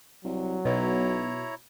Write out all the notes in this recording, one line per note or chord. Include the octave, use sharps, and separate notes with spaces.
C2 F#3
B1 B2 E4 C#5 A#5